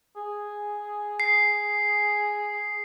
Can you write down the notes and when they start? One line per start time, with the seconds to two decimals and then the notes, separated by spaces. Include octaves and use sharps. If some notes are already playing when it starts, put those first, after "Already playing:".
0.17 G#4
1.20 C7